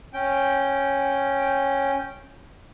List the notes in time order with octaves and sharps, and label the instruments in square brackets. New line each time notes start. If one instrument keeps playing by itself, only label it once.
[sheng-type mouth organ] C#4 G5